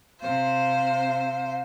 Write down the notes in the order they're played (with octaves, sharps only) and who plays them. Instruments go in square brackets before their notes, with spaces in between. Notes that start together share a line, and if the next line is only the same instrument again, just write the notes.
[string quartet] C3 C5 [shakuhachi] F5